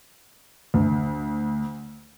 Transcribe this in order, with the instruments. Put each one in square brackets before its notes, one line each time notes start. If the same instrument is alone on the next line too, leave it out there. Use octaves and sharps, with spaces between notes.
[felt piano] D2